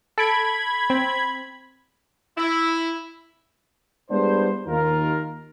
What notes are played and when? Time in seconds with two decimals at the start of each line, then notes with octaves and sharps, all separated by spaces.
0.18 A4 B5 G#6 D7
0.90 C4
2.38 E4
4.11 G3 G#3 B3 D4 E4 C5
4.66 D#2 D#3 F4 A#4